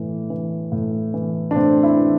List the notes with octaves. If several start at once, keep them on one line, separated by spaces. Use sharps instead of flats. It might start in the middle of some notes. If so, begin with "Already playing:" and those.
Already playing: A2 E3
E3
A2
E3
D4
A2 C4
E4
E3